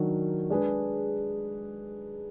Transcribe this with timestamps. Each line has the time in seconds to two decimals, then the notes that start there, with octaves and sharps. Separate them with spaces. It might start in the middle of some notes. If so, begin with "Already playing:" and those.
Already playing: D#3 F#3 D4 F#4 A#4
0.50 G#3 D4 G#4 B4